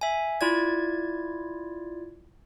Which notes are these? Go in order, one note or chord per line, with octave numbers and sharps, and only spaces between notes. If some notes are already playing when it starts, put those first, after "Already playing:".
E5 G#5
E4 F4 D5 G#6